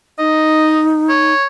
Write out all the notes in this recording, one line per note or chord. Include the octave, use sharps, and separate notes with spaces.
D#4 D#5
C#5